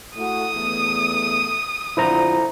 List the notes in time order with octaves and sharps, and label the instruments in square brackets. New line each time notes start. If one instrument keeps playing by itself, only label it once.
[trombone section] A3 E4 F#4 [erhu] D#6
[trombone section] E2 A3
[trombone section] F2 D3 F3 [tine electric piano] E4 C5 A#5